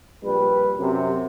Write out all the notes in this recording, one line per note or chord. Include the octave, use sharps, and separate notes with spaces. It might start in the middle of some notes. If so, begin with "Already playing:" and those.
A#1 G3 B4
F#2 C3